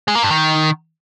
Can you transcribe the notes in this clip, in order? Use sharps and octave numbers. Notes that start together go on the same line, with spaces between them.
G#3
A#3
G2
D#3